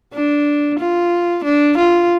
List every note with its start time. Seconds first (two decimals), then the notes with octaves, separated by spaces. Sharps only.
0.14 D4
0.79 F4
1.45 D4
1.78 F4